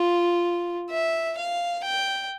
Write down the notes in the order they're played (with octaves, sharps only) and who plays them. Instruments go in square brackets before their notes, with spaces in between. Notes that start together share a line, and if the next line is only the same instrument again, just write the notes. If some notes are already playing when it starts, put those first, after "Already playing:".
Already playing: [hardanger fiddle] F4
E5
F5
G5